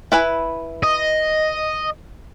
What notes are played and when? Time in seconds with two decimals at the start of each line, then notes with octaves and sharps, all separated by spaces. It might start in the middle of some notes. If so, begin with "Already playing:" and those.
0.12 E4 B4 G#5
0.83 D#5